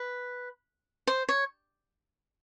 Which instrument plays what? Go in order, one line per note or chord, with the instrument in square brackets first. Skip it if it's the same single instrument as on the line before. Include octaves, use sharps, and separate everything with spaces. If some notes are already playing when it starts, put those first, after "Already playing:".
Already playing: [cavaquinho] B4
C5
C#5